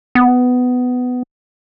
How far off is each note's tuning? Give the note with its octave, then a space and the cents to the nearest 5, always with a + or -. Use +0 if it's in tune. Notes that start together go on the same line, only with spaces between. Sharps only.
B3 +15